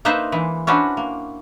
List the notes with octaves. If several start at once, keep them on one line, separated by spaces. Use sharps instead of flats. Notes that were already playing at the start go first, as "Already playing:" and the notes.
A#3 D#4 B4 C5 E5
E3 G#3
C#4 D4 E4 F#4 B4 C5
A#3